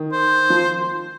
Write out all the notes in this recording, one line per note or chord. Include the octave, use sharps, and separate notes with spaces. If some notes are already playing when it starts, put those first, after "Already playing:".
Already playing: D#3
C5
F3